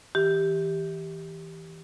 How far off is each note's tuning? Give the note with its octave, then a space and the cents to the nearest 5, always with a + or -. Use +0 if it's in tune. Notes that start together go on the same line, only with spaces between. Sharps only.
E3 -30 G4 +0